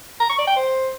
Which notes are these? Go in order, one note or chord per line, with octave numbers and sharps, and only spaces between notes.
A#5
C#6
D5
G5
C5